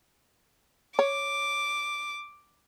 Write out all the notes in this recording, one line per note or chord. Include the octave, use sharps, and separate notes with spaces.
C#5 D6